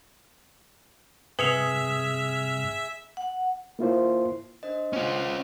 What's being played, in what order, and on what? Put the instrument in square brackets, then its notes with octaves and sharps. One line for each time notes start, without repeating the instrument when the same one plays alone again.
[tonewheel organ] G2 C3 F6 [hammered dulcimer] G#4 [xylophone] B4 C#7 F7 [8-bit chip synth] E5
[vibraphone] F#5
[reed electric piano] A#3 E4 F4 C5
[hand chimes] D4 C5 D#5
[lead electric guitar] C#4 F4 [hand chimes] C5 F#5 C6